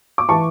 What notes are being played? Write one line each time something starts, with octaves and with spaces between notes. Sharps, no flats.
D6
E3 A5 C#6